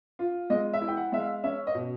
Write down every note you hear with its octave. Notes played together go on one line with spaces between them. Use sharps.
F4
G#3 D#5
E5
E4
G5
F#5
G#3 E5
F5
C#4 E5
D#5
B2